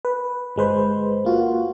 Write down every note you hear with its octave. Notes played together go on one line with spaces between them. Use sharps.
B4
G1 G#3 B4 C5
A#3 F4 F#4